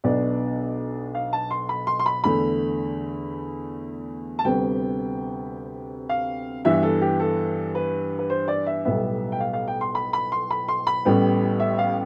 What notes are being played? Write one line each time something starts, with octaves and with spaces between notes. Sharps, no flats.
B1 B2 B3 D4 D5
F5
A5
C6
B5
C6
C6
B5
E2 D3 A3 B5
A5
D2 C3 G3 B3 G5
F5
G2 E3 B3 E5
A4
G4
A4
B4
B4
C5
D5
E5
B1 A2 G3 B3 E5
G5
F5
F5
G5
C6
B5
B5
C6
B5
C6
B5
A1 A2 G3 B3
E5
F5